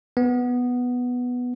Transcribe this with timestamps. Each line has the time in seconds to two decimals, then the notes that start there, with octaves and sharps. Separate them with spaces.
0.17 B3